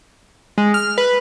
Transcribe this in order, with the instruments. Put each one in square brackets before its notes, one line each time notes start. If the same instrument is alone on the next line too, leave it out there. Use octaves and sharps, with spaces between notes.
[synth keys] G#3
F6
B4